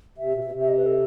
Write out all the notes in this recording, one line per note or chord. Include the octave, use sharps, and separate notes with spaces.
C3 E5
B2
B2
C3
E5
D#5
B4
A4